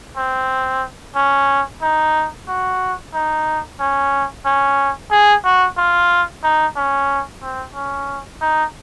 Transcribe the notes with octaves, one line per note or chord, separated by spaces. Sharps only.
C4
C#4
D#4
F#4
D#4
C#4
C#4
G#4
F#4
F4
D#4
C#4
C4
C#4
D#4